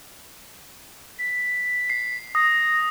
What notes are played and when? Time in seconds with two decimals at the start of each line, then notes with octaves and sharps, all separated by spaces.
1.19 B6
1.90 C7
2.35 D#6 A#6